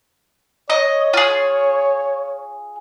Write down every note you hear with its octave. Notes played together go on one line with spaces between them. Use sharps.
C#5 D#5
F4 G#4